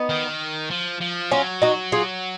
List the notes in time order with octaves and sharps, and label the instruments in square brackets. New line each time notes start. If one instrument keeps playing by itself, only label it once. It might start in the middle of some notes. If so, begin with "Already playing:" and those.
Already playing: [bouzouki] B3 D#4
[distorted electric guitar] D#3
F3
F3
[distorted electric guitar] F#3 [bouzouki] C#4 F4
[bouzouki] D#4 F#4
F4 G#4